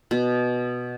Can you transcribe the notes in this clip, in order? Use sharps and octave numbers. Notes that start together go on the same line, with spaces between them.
B2